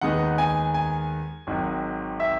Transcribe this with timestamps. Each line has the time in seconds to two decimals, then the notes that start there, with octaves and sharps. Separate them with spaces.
0.01 D#2 D#3 G#3 B3 D#4 F#5
0.38 G#5
0.74 G#5
1.47 G#1 G#2 D#3 F#3
2.20 E5